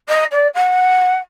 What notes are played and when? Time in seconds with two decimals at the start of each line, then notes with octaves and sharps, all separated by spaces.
0.08 D#5
0.31 D5
0.54 F#5